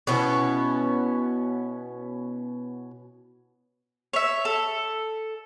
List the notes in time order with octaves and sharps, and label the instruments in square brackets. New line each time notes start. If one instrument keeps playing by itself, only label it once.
[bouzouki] B2 B3 C#4 E4
[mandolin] C#5 E5
A4